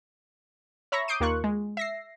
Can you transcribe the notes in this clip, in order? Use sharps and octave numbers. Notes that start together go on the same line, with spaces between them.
C#5 E5 A#5 B5 C#6 A#6
D6 D#6 G6 C7 D7 D#7
D#2 A#3 F4 C#6 F#6
G#3
E5 A#6 C7